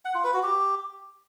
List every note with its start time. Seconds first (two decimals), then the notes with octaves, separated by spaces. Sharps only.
0.05 F#5
0.15 F4
0.24 B4
0.34 F#4
0.43 G4